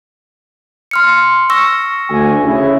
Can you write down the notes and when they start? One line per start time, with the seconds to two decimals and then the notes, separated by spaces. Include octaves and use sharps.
0.91 C6 F6 C#7
1.50 C#6 E6 A#6
2.10 D2 G#5
2.44 C#3 E4